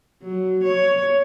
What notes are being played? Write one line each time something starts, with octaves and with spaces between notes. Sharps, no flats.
F#3
C#5